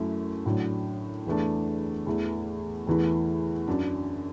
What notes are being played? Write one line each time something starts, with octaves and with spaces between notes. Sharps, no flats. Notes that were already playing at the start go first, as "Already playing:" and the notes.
Already playing: F#2 F#3 A3 E4
A2 F#3 D4
E2 E3 A3 D4
E2 E3 A3
E2 E3 A3 E4
F#2 F#3 D4